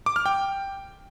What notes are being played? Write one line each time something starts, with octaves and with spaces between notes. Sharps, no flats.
D6
F6
G5